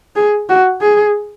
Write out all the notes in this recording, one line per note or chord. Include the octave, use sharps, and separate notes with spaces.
G#4
F#4
G#4